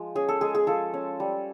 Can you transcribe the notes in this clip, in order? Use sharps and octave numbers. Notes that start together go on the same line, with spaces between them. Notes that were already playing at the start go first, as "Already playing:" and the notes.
Already playing: F3 G#3
C#4 G#4
A4
G#3 G#4
G#4
F3 A4
C#4
G3